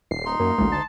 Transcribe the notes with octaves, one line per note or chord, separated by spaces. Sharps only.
D#1 C7
D#4 C6
F#2 A#3
A1 D2 G#3 A#3
A5